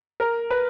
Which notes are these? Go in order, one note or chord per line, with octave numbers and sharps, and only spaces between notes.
A#4
B4